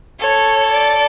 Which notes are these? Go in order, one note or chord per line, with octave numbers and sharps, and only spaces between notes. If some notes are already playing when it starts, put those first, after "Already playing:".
A4 C#5
D5